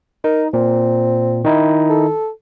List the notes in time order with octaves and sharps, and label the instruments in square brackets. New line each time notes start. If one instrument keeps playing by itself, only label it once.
[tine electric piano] D#4 [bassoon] A#4
[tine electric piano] A#2 [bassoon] C4
[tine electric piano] D#3 D#4 E4
[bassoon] A4